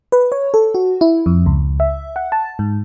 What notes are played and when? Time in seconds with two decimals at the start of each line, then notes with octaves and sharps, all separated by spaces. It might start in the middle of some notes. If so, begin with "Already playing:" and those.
0.12 B4
0.32 C#5
0.54 A4
0.74 F#4
1.01 E4
1.26 F2
1.46 C#2
1.80 E5
2.16 F#5
2.32 A5
2.59 G#2